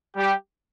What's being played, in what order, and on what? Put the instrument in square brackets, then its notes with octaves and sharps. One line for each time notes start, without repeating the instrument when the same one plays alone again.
[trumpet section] G3 G4